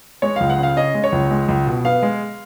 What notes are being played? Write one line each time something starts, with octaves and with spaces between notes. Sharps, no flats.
G#3 C#5
C#2 F5
F#5
C#3
F5
C#4 D#5
G#3
C#5
C#2
G#3
C#2
B2
B3 F5
G#3